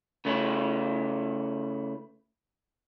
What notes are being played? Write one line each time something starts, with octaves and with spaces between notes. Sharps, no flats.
C#3 A3 C#4 E4